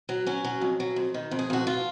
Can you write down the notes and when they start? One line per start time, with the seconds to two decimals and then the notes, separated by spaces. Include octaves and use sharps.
0.09 F#3
0.26 F#3 C#4
0.44 F#3
0.61 F2
0.80 F#3
0.96 F2
1.14 D#3
1.31 F2
1.39 G#4
1.50 F2 F#4
1.67 F4